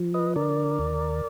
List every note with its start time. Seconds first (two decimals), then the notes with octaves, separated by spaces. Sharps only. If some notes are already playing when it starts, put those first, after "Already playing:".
Already playing: F3
0.14 B4 D#5
0.35 D3 A#4 D5
0.79 D#2